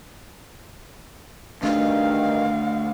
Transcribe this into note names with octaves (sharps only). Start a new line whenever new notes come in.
G2 D#3 A3 D4 F5